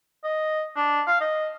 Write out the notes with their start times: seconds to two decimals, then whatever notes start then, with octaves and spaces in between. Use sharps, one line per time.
0.24 D#5
0.76 D4
1.07 F5
1.21 D#5